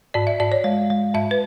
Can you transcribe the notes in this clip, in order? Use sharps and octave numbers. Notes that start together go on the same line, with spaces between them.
G#2 D5
E5
G#2 D5
C#5
G#3
G#3
G#2 E5
B4